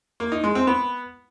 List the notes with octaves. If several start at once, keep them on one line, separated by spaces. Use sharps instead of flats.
A#3
D#4
G#3
C4
B3